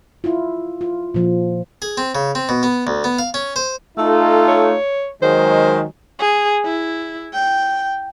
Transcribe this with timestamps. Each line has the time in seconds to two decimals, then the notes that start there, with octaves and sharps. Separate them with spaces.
0.24 E4 F4
0.81 F4
1.14 A#2 F3
1.82 G#4
1.97 C4
2.15 C#3
2.35 C4
2.49 B2
2.63 B3
2.87 D2
3.04 B3
3.19 F5
3.34 C#4
3.56 C5
3.98 A3 D#4 F4 A4
4.48 C#5
5.22 D#3 F#3 G#3 C5
6.19 G#4
6.65 E4
7.33 G5